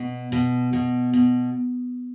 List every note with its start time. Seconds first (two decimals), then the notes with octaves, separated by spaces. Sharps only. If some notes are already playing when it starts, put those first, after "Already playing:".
Already playing: B2
0.32 B2
0.73 B2
1.13 B2